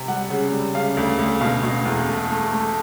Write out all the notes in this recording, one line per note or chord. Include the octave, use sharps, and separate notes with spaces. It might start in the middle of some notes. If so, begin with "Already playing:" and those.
Already playing: C3
G3 F#5
C#3
G3
C#3 F5
D2
D2
B2 F5
B2
E2
A3
A3
A3